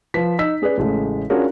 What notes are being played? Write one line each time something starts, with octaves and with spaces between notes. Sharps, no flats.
F3 B4 B6
D#4 E6 B6
C#4 G#4 B4 D5
A1 C#3 G#3 A3
C#4 D4 F4 F#4 G#4 A#4